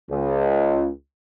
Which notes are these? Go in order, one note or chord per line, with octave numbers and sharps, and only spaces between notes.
C#2